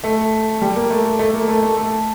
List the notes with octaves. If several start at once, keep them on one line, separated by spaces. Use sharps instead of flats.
A3
G3
A#3
A3
A3
A#3
A3
A3
A3